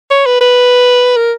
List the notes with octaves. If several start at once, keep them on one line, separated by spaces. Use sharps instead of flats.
C#5
B4
B4
A#4